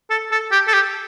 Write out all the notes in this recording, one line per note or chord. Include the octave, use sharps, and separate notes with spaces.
A4
A4
G4
A4
G4